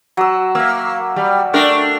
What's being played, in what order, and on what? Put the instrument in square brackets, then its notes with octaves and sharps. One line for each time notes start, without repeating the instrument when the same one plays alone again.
[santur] F#3 E6
[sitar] A#3 [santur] E5 E6
[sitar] G3
A3 D4 A#4